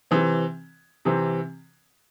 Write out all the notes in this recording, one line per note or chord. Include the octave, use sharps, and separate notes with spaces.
C3 E3 C4
C3 E3 C4